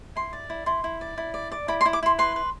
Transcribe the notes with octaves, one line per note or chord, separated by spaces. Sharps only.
E4 C6
D5
E4
E4 C6
E4
D5
E4
D5
D5
E4 B5
C6
E4
D6
E4 C6
B4 C6
B4